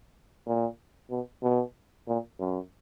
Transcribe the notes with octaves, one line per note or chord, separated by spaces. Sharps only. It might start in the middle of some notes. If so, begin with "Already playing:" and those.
A#2
B2
B2
A#2
F#2